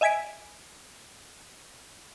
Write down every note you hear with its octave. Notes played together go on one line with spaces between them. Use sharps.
D#5 E5 G#5 G#6 B6 D7